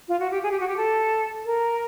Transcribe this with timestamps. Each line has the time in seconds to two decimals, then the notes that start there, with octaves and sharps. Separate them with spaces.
0.08 F4
0.20 F#4
0.31 G4
0.43 G#4
0.51 G4
0.60 F#4
0.68 G4
0.77 A4
1.45 A#4